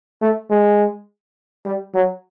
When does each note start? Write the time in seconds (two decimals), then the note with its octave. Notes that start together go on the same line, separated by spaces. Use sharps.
0.21 A3
0.50 G#3
1.65 G3
1.94 F#3